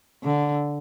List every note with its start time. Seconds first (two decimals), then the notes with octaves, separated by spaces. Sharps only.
0.23 D3